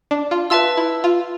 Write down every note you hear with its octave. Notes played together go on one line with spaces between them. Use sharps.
D4
F4
F4 B4 E5 A5 E6
E4
F4